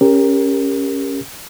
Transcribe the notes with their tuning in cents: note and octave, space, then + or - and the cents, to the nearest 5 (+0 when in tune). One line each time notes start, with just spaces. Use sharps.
C#4 +0 G4 +25 A#4 +0